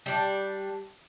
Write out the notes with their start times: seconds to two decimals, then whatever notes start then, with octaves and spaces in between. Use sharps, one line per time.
0.06 G3 D4